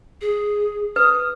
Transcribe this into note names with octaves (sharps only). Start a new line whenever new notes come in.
G#4
B4 D#6